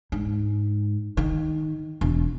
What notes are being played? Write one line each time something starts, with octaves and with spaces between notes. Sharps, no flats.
G#2
D#3
E1